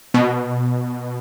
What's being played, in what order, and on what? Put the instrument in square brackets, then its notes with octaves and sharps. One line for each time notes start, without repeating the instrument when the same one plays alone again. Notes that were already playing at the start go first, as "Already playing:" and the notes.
[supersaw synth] B2